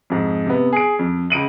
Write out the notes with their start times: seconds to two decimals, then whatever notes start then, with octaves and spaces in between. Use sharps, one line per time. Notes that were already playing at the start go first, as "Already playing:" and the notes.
0.10 F2 G#2
0.46 C3 B3
0.73 G#4 D7
0.99 F2
1.30 C#2 D7 D#7 F#7